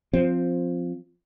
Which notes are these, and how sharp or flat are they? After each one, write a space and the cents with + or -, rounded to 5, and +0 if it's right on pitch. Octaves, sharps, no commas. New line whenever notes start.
F3 +0 C4 +0